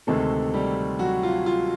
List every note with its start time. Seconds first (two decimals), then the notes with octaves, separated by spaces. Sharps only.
0.07 D2 C3 D#3 G#3 A3 C4 A4
0.54 G3 G4
0.99 F#3 F#4
1.23 F4
1.46 F4